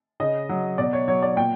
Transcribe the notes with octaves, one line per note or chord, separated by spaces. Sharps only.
C#3 D#5
F#3
B2 D5
C#5
F#3 C#5
D5
A#2 G5